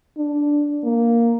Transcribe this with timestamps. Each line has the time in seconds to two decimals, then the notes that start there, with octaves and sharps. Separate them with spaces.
0.17 D4
0.84 A#3